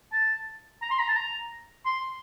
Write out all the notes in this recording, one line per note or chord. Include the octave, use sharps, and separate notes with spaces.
A5
A#5
C6
A#5
A5
A#5
C6